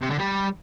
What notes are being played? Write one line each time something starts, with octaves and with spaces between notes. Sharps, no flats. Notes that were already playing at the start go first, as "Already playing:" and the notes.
C3
D3
G3